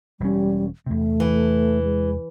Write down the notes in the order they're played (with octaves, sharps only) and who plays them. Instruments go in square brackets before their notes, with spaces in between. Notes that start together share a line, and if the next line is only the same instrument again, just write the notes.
[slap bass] E1 C#4 [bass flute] G3
[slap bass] E2 C3 [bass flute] A3
[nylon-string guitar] E3
[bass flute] G#3